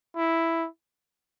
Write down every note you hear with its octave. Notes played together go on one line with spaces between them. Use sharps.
E4